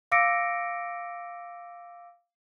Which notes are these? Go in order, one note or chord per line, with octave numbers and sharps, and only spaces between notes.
F5 D6 E6 A#6 C#7 D7